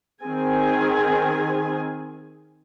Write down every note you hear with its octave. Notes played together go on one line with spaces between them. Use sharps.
D#3 C4 G#4 G#5